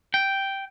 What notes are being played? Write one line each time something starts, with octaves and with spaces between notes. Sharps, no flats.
G5